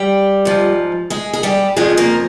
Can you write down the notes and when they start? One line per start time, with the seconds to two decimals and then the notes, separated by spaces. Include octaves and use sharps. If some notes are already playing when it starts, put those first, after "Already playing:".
Already playing: G3 G4
0.45 G#2 F3
1.10 G#3 G#4
1.33 G#4
1.43 G3 G4
1.76 F2 C#3 F3 G#3 G#4
1.97 A#3 A#4